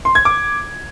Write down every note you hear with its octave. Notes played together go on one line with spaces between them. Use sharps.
C6
G#6
D6